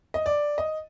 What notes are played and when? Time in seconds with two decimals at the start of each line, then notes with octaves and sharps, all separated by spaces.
0.14 D#5
0.26 D5
0.58 D#5